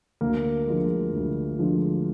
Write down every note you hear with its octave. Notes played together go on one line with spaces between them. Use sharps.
D2 A#3 A#4
D3 F3 G#3
D2
D3 F3 G#3